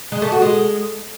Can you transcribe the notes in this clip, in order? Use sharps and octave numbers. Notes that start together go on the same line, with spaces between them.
G#3
A3
F#4
G#3